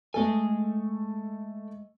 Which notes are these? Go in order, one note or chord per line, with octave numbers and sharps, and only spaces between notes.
G#3 A3 A4 G#5